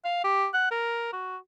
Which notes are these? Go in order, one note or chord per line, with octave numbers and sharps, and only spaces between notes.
F5
G4
F#5
A#4
F#4